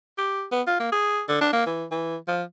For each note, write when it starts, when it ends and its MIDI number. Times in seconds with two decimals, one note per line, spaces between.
0.18 0.44 67
0.52 0.62 59
0.67 0.75 65
0.80 0.91 58
0.92 1.22 68
1.28 1.38 50
1.41 1.49 62
1.53 1.64 58
1.66 1.85 52
1.91 2.16 52
2.28 2.43 53